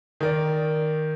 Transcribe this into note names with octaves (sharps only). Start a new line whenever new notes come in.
D#3 A#4 D5